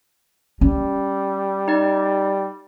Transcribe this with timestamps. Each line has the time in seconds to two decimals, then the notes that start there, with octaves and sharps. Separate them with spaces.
0.61 G3 C#4
1.68 D#4 D5